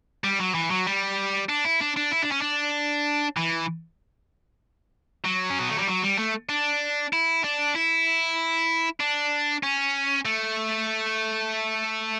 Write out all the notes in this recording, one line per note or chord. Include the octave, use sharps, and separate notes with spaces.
G3
F#3
E3
F#3
G3
D4
E4
D4
D4
E4
D4
C#4
D4
E3
F#3
C#4
B3
A3
G3
F#3
G3
A3
D4
E4
D4
E4
D4
C#4
A3